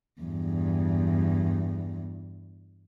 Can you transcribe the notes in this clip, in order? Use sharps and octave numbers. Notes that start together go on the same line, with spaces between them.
E2 G2